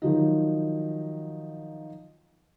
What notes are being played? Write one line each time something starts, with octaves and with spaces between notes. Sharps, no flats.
D#3 F3 F#3 D#4